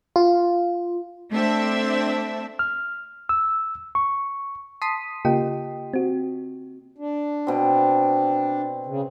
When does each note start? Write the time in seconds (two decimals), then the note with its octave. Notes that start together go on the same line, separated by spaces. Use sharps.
0.16 F4
1.32 A3 C4 D4 E5
2.59 F6
3.29 E6
3.95 C#6
4.82 A5 C6 D#6 B6 C7 D#7
5.25 C#3 A#3 F4 G4 D#5 G5
5.93 C4 F#4
6.98 D4
7.47 B2 C4
8.86 C#3